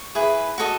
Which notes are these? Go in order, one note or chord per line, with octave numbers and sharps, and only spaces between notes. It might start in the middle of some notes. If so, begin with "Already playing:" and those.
Already playing: C#6
E4 G#4 B4
F#4 A4 D#5